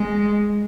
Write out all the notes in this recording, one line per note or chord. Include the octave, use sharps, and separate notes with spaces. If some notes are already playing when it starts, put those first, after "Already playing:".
Already playing: G#3